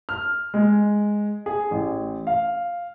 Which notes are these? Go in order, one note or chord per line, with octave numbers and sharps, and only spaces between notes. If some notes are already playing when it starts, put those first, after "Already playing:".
F6
G#3
G#4
A1
F5